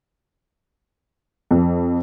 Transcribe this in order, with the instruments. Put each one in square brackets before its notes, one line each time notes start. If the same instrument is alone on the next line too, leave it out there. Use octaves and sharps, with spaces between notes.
[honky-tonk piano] F2